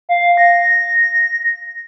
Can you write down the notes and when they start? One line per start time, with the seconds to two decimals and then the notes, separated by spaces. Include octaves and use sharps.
0.09 F5
0.37 A#6